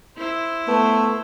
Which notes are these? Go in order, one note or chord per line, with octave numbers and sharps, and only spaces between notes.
E4 C5
A3 B3